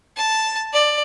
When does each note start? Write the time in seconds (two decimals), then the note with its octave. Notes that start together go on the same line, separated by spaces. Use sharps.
0.17 A5
0.73 D5